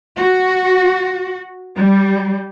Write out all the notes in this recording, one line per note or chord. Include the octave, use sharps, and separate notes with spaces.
F#4
G3